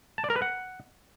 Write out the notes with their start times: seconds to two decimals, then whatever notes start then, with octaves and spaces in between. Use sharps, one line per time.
0.18 A5
0.24 D5
0.30 A#4
0.36 B4
0.42 F#5